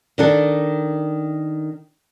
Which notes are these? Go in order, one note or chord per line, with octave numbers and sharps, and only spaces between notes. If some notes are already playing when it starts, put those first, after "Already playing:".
D#3 D4 A4